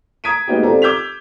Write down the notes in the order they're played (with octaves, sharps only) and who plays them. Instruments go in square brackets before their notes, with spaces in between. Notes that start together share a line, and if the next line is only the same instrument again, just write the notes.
[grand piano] A#5 D#6 G#6 B6 D7 D#7
G#3 A#3 B3 D#4 F#4 G4
C4 F4 G4 A4 D5 A#5
D6 E6 G6 G#6 B6 F7